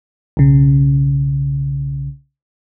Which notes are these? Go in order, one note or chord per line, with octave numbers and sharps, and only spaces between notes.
B1 C#3